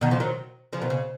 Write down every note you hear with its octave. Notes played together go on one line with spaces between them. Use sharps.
B2 D#3
C#3 F3
D#3 F#3
C#3 F3
B2 D#3
C#3